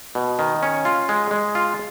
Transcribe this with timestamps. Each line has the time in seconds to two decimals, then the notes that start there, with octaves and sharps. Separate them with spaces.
0.15 B2
0.39 D#3
0.63 C#4
0.85 F4
1.09 G#3
1.31 G#3
1.55 F4